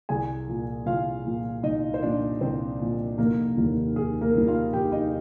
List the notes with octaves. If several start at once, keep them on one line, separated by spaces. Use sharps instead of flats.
C2 G#4 G#5
A#2 F3
C2 F4 F5
A#2 F3
C2 D#4 D#5
C5
A#2 F3 D4 D5
C2 C4 C5
A#2 F3
F1 A#3 A#4
D#2 D#3 G3
F1 G#4
A#3 A#4
D#2 D#3 G3
F4 F5
F1 G4 G5
D#4 D#5